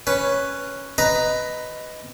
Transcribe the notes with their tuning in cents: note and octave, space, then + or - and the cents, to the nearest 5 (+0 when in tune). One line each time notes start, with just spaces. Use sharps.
C#4 +0 B4 +0
B4 +10 D#5 +0 A#5 +10